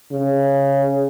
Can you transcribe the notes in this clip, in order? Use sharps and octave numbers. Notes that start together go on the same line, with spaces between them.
C#3